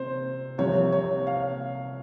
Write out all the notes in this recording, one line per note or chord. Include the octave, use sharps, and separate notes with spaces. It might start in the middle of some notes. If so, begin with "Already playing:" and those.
Already playing: C3 C5
C2 C3 F3 C#5
C#5
F5